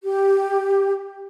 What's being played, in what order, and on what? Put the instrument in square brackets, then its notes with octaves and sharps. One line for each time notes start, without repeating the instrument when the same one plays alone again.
[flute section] G4